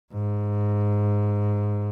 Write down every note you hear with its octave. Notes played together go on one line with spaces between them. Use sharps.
G#2